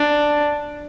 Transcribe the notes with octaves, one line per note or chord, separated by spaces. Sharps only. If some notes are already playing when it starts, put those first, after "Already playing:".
Already playing: D4